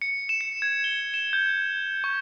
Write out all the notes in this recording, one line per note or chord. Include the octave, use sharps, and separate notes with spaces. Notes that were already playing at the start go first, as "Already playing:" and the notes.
C#7
E7
C#7
G#6
G7
E7
G6
C#6